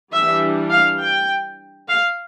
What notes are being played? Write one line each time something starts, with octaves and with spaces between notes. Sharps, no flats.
E3 G3 D4 E5
F5
G5
F5